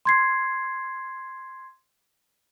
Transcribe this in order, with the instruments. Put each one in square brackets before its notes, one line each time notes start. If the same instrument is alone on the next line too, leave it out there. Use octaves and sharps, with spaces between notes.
[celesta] C6 G#6 C7